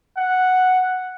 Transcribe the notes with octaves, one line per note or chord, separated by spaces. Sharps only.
F#5